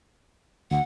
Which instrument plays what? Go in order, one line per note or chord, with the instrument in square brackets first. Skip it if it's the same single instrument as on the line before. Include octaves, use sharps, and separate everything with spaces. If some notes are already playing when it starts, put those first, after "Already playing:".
[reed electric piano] D2 [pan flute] F#5